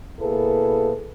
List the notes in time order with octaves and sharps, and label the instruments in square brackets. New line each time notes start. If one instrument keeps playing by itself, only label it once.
[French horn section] B2 A#3 E4 G#4 A4 B4